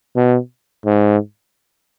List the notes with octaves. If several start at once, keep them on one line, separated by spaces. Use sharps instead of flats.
B2
G#2